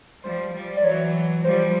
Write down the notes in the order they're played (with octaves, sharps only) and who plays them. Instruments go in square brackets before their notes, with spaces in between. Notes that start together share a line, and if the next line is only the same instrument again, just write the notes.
[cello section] F3 G3 [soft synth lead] C5
[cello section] F3 G3
[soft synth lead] D5
[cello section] E3 F#3 [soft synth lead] C#5
[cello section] F3 G3 [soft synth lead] C5
[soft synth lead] C5